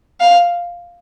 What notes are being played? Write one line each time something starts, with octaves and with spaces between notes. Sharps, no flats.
F5